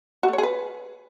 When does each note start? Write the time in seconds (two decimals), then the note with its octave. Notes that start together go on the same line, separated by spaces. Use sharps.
0.23 F#4
0.28 A3
0.33 C#5
0.38 G#4
0.43 B4